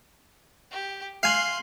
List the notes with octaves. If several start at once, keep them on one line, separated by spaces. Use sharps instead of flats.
G4
F5 G#5 C6 F#6